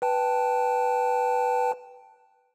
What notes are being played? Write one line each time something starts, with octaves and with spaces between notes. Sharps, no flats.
B4 G5 A5